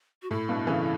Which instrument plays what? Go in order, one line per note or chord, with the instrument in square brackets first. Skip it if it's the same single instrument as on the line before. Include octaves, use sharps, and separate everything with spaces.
[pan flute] F#4
[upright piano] A2 [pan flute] E4
[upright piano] G2 B2
C#3 E3